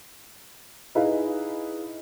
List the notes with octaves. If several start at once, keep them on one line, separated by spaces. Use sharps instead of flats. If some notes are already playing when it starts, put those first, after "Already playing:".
D#4 E4 G#4 B4 D#5 F5